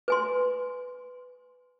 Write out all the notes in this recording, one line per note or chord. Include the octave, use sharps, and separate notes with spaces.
B4 G#5 C6